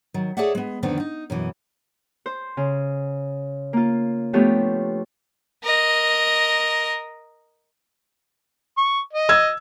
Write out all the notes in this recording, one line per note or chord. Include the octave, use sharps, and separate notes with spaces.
D#3 F#3
G#4 A4 C#5 D5 E5 F#5
G#3 B3
F2 D3 D#3 B3 C4
D#4
F#2 B2 E3
C5
C#3
A#3 F4
F3 A3 B3 D4 G4 C#5
A#4 D#5
C#6
D#5
E6 G#6